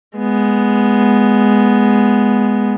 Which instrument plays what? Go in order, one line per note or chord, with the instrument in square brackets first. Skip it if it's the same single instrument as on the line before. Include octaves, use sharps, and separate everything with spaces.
[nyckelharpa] G#3 B3